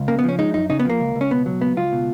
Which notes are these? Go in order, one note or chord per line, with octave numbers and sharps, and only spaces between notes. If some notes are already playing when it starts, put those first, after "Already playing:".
Already playing: C#2
C#3 A#3
B3
F3 C#4
G#3 D#4
F#2 D#4
C#3 D#4
B3
F3 A#3
C#2
C#2
C#4
B2 B3
F#3
C#2 B3
C#2 F4
B2